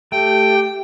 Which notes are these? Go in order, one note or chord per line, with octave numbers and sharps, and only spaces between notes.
A3 G4 G5